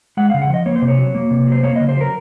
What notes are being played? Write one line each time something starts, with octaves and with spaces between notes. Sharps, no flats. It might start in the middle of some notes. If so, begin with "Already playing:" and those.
G#3 F#5
C#3 F5
F#5
F3 D#5
A#3 C#5
C5
C3
C#5
F#3
A#3
C3
F#3 C5
A#3 C#5
C#3 D#5
C5
F#3 A#4